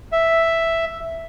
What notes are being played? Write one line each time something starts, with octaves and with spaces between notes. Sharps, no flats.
E5